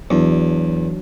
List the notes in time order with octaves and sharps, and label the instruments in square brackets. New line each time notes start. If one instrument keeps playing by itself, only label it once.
[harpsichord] E2 [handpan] F#3 D4